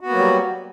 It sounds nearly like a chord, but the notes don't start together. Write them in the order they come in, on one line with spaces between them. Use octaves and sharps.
F#4 B3 A#3 F#3 G3